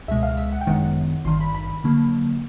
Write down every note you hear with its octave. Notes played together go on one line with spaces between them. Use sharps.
C#2 B2 G#3 E5
F5
E5
F#5
G5
G1 F#2 D#3 G#3 B3 F#5
G#1 G2 D#3 C6
B5
B5
D3 F#3 A#3